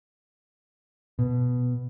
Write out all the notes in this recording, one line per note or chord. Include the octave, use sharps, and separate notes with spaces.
B2